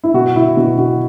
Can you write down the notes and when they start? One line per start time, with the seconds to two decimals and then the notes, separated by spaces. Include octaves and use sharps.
0.04 E4
0.14 B2 F#4
0.35 B2 E4
0.57 B2 F#4
0.78 B2 F#4